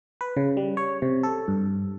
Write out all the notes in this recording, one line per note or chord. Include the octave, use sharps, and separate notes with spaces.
B4
C#3
G3
C#5
C3
A4
G2